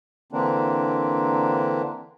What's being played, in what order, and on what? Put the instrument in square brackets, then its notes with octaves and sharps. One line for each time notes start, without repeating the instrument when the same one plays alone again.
[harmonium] D3 E3 A#3 C4 D4